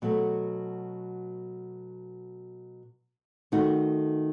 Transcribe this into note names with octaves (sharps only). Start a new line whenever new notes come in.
B2 F#3 A3
D#3 A3 D#4 F#4